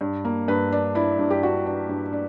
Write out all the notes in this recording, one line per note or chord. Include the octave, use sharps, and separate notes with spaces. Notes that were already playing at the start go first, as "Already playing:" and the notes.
G2
A#3
G2 B4
D4
D4 E4
G2
G4
D4 F#4
D4
G2
D4